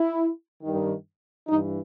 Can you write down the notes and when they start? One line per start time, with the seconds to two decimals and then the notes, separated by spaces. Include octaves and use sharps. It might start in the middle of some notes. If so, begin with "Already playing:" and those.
Already playing: E4
0.61 G2 D#3
1.48 G2 E3 D#4